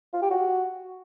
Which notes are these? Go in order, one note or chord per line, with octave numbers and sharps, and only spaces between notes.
F4
G4
F#4